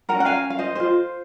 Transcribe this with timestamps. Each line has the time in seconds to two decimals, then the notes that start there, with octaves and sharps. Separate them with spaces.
0.09 C#4 F#4 A#4 F#5 A#5
0.20 F#5
0.25 F5 G#5
0.50 F5
0.59 C5 D#5
0.75 G#4 C5
0.80 F4